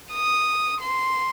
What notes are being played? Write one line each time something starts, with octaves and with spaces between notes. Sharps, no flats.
D#6
C6